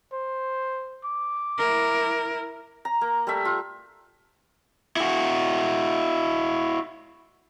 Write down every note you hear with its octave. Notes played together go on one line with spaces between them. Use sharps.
C5
D6
E4 A#4
A#5
A#3
G3 A3 E5
F4
E4 F#4